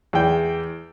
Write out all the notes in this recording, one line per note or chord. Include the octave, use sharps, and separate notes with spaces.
E2 G5